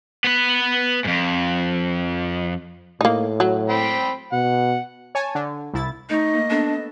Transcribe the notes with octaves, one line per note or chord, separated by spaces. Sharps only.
B3 B4
F2 G#2
A2 A#3 D#4
F#3
C4 G5 B5
B2 F#5
C#5 G#5 A5
D3
C2 E4 A6
A3 D#4 D#5 C#6
A#3
B3 D4 A4